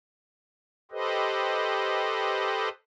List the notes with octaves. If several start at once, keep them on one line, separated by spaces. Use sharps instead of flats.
G4 A4 B4 C5 D#5